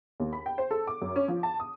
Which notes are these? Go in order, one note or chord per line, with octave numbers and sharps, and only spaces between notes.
D#2
B5
G5
C5
A4
D6
F#2
C#4
F3
A5
D#6